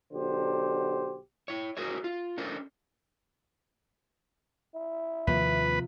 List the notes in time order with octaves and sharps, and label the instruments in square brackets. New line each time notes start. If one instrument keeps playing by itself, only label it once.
[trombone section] B1 D3 G4 C5
[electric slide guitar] E4 C#5
F#4 G#4 A#4 C5 C#5
F4
C#4 D4 A4 A#4 C5
[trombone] E4
[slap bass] D#2 D#3 A#3 [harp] C3 F3 [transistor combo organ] B4